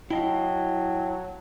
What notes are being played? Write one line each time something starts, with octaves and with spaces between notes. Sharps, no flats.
F#3 E4 D#5 F5 G5 A5